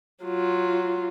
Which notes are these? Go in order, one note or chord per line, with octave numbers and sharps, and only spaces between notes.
F#3 F4